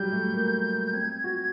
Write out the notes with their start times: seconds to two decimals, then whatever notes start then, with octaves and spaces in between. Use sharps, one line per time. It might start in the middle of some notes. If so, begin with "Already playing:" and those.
Already playing: F#3 G3 G6
0.12 A3
0.33 A#3
0.93 C4 G#6
1.24 F#4